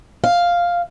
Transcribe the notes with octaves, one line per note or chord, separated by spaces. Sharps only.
F5